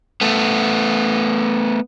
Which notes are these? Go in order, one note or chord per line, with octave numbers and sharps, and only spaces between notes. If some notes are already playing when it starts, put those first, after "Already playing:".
A3 B3